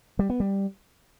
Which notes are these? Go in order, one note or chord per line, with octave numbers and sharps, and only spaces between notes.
G3
B3
G3